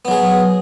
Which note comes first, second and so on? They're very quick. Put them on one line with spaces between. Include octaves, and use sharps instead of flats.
B3 F#3 G#4